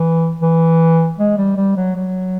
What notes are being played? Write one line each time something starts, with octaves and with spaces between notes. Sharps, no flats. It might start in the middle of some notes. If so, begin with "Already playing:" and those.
Already playing: E3
E3
G#3
G3
G3
F#3
F#3